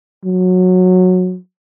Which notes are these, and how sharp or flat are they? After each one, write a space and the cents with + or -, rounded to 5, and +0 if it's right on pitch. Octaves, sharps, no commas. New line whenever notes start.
F#3 -15